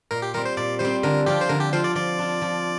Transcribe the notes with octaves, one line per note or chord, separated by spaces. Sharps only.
A#2 A#4
G4
G3 C4 A#4
C5
A#2 D5
G3 C4 C5
D3 A#4
F3 C4 F4 G4
C5
D3 A#4
G4
F3 C4 F4 C5
D5
F3 D5
D4 F4
F3